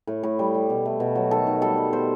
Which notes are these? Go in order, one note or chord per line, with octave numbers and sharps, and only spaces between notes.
A2
A2
G3
G3
B2
A3
B2
F#3
D#3 A4
D#3
G3 A4
G3
B2 C5